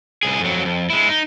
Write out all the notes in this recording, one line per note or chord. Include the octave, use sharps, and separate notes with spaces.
C2 G#4
F2 F#3
F2
G#3 E4
D#4